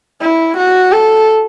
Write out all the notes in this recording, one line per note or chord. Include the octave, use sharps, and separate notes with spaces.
E4
F#4
A4